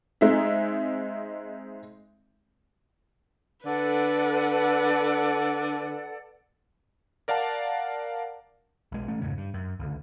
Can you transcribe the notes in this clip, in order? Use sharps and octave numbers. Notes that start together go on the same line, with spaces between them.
G#3 C4 D#4 E5
D3 A4 B4 D5 F#5
A#4 D5 F5 F#5 A5
B1 G#3
A1 A3 C#4
F2 G#2 C#3
G2
F#2
C#2 D3